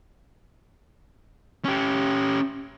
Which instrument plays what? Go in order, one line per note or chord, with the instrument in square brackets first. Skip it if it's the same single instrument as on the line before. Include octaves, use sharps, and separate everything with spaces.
[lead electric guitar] C#4 G4